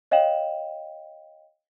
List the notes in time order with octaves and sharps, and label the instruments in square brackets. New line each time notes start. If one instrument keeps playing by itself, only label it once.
[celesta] C#5 D#5 F5 G5 E7 F#7